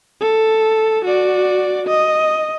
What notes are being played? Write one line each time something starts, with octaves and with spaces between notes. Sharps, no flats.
A4
F#4 D5
D#5